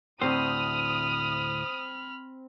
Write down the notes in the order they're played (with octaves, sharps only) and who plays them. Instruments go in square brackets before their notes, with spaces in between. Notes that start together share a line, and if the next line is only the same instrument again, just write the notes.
[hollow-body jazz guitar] D2 A2 C5 [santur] C4 [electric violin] B5 F6 [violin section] D#6